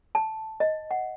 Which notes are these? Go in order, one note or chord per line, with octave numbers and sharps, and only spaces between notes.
A5
D#5
F#5